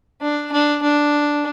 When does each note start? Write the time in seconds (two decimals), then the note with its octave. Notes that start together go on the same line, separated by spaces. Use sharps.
0.22 D4
0.52 D4
0.83 D4